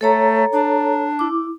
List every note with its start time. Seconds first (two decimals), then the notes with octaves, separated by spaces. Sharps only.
0.01 A3 A4 C#5 A#5
0.52 D4
1.19 E4 D6